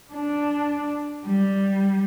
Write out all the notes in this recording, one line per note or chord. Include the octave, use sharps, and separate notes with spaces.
D4
G3